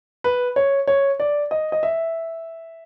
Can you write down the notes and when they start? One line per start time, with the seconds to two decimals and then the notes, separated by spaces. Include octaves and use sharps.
0.24 B4
0.56 C#5
0.87 C#5
1.20 D5
1.51 D#5
1.72 D#5
1.83 E5